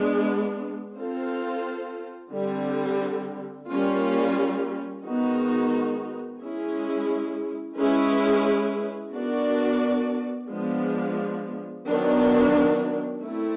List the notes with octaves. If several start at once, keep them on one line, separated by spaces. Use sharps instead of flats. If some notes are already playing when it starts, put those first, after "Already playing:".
Already playing: G#3 B3 D4
C4 F4 A4 C5
D3 G3 C4
G3 A#3 C#4 F4
D#3 G#3 B3 D#4 F#4
G#3 C#4 E4 G#4
G#3 C#4 E4 G#4 B4
B3 D4 F#4 A#4 D5
F3 G#3 B3 D4
D#3 F#3 B3 D4
A3 C4 E4